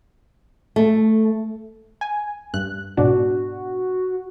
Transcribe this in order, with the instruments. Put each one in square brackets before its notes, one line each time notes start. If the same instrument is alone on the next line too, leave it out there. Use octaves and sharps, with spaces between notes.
[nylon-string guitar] A3
[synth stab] G#5
G2 F#6
[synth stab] G#2 B2 D4 [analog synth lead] F#4